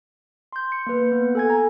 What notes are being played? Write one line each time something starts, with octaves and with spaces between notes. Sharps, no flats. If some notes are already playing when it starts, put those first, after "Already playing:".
C6 G6
C#7
A#3 B4
B3
A4 G#5 G#6
A#5